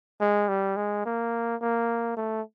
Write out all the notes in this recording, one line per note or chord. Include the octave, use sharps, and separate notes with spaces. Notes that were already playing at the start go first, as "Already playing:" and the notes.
G#3
G3
G#3
A#3
A#3
A3